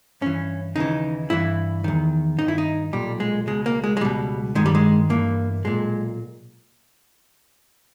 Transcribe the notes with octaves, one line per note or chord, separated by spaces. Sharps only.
G2 E3 C#4
D#2 C#3 E3 D#4
G2 E3 E4
E2 D#3
G2 D#3 D#4
E4
D#4
B1 A#2 G3
G#3
C#2 B2 G#3
A#3
G#3
G#3
C#2 B2 G3
G2 D#3 G#3
G3
G#3
G2 E3 A#3
B1 A#2 G#3